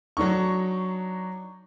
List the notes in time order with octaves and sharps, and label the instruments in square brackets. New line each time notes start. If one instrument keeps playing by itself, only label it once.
[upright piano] F#3 D4 D#4 C#6